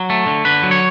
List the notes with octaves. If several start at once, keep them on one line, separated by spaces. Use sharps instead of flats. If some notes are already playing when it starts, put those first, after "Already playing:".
Already playing: F#3
A3
D3
D3 B4
F#3
C#5